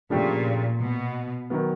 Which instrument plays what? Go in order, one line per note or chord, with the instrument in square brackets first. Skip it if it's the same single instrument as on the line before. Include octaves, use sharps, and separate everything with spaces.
[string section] A#2 [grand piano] C#3 F3 A3 D4 G4
[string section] B2
[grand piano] D#3 F#3 B3